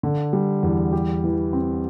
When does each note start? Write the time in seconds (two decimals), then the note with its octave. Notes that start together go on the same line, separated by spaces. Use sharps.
0.03 D3
0.33 G3
0.63 E2
0.93 G4
1.24 E3
1.53 C4